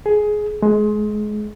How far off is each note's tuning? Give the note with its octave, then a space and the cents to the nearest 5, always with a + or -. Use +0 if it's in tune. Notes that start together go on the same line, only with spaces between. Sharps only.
G#4 +15
G#3 +25